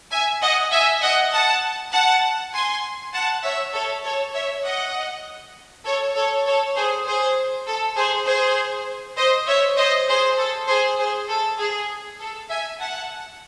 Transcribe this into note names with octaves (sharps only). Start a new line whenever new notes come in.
E5 G#5
D#5 F#5
E5 G#5
D#5 F#5
F#5 A5
F#5 A5
G#5 C6
F#5 A5
C#5 E5
A4 C#5
A4 C#5
C#5 E5
D#5 F#5
A4 C#5
A4 C#5
A4 C#5
G#4 C5
G#4 C5
A4
G#4 C5
G#4 C5
C5 D#5
C#5 E5
C5 D#5
G#4 C5
A4
G#4 C5
G#4 C5
A4
G#4
A4
E5 G#5
F#5 A5